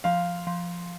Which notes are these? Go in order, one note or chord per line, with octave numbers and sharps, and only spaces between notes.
F3 F5
F3